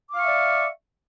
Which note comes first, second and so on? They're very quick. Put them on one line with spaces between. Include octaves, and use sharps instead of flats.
D6 F5 C#6 E5 D5